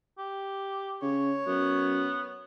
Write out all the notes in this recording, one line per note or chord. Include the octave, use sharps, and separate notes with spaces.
G4
C#3 C#5
F#2 B3